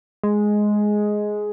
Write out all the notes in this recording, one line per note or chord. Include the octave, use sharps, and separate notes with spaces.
G#3